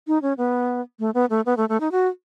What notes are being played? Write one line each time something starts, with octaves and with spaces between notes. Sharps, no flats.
D#4
C#4
B3
A3
B3
A3
B3
A3
A3
D#4
F#4